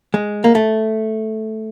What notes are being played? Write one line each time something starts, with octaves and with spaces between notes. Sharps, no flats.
G#3
A#3
A3